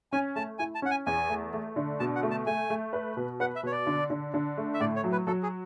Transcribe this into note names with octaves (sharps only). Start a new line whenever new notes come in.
C#4 G#5
A3 A5
E4 G#5
A5
C#4 F#5
G#5
E2 G#5
A3
A3
D3
B2 A5
F#5
A3
A5
A3 G#5
A3
B4
B2
B4 F#5
E5
B2 C#5
D5
D3
D3
D3
A3
E5
A2 D5
C#5
F#3
B4
F#3 A4
G#4